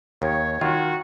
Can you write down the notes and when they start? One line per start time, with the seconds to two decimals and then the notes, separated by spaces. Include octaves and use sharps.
0.22 D#2 D#3 C#5
0.61 D#3 F4 F#4